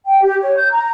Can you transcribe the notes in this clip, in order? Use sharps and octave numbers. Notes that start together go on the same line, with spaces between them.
G5
G4
C#5
G6
A#5